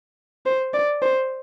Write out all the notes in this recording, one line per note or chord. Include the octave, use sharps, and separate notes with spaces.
C5
D5
C5